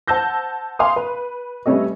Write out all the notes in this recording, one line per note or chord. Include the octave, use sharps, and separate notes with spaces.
C5 F#5 A5 E6 G6 A#6
F5 G#5 C6 D6 D#6
B4
G3 A3 B3 C#4 A4 D#5